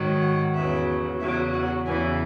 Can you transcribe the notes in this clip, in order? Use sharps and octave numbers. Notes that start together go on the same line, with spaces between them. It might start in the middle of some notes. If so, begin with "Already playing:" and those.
Already playing: G#2 D#3 F#3
F#5
E2 C#3 F#3 E5
E2 C#3 F#3 E5
F#5
E2 C#3 E3 G#5